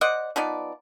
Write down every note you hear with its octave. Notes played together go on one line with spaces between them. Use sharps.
C5 D5 D#5 F#5
F3 B3 D#4 D5